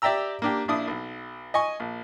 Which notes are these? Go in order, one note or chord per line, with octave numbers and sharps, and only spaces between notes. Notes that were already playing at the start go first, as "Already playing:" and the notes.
G4 D5 E5 G5 A#5 E6
A#3 D4 G4
A#1 D4 E4 D#6
B1
D#5 G#5 C#6
A#1